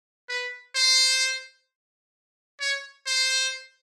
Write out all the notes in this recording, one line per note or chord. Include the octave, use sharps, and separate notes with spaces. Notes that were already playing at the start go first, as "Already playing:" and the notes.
B4
C5
C#5
C5